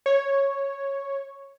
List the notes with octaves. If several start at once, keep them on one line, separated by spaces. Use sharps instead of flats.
C#5